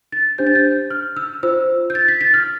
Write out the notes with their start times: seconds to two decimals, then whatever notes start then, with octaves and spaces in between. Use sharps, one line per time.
0.12 A6
0.38 D4 G4 C5 G6
0.47 A6
0.55 G6
0.91 F6
1.17 E6
1.43 F4 C5 E6
1.90 G6
1.95 A6
2.08 B6
2.21 A6
2.34 F6